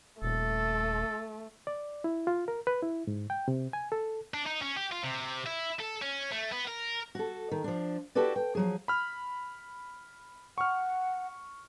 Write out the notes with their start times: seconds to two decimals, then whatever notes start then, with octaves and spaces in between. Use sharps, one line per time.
0.22 D#1 A3 A4
1.67 D5
2.04 E4
2.27 F4
2.48 A#4
2.67 B4
2.82 E4
3.07 G#2
3.30 G5
3.48 C3
3.73 G#5
3.92 A4
4.34 D4
4.46 D#4
4.62 C#4
4.77 G4
4.92 F4
5.04 C3
5.46 E4
5.80 A4
6.02 C#4
6.31 A3
6.52 B3
6.67 A#4
7.15 F#4 A4
7.51 D#3
7.64 F3 D4
8.15 E4 F#4 G4 A4 B4 D5
8.36 G5
8.55 F3 F#3 G#4
8.88 B5 F6
10.58 F#5 C#6 F6